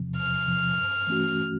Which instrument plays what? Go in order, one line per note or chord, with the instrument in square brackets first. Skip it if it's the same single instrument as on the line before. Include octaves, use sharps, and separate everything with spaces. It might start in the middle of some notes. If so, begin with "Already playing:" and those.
Already playing: [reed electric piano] E2 C3 F3
[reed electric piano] E2 [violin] F6
[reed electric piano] C3 F3
G2
E3 A3 C#4 F#4